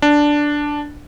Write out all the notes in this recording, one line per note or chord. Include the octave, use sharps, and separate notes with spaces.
D4